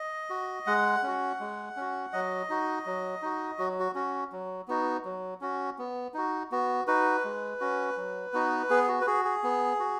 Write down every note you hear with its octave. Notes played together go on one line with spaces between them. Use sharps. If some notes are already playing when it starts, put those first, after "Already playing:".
Already playing: D#5
F#4
G#3 F#5
C#4 F#4
G#3
C#4 F#4
F#3 D#5
D#4 F#4
F#3
D#4 F#4
F#3 F#4
F#4
C#4 F#4
F#3
B3 D#4 F#4
F#3
C#4 F#4
B3
D#4 F#4
B3 F#4
D#4 F#4 B4
G#3
C#4 F#4
F#3
B3 D#4 F#4
B3 G#4
F#4
B4
F#4 G#4
G#4
B3
F#4